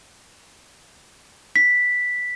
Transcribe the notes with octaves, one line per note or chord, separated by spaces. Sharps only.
B6